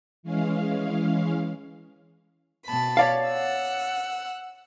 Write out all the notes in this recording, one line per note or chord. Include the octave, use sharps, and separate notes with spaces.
E3 G#3 C#4 F5
B2 A5 B5
C#5 D5 F5
F#5 E6